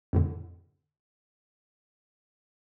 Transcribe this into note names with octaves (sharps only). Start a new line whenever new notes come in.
F2 A2 D3